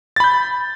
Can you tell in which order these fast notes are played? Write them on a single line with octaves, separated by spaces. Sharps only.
A6 B5 G6